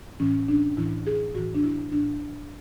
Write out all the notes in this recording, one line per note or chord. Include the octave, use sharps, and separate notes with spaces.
A2 E3 C#4
D4
A2 E3 E4
G#4
A2 E3 F#4
D4
E4
A2 E3 D4